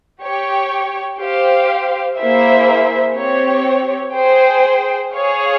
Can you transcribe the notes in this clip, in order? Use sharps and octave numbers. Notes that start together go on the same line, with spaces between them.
G4 C#5 G5
G4 C5 F5
A#3 E4 G#4 C5 E5
C4 G4 C#5
G#4 C5 G5
G#4 C#5 F5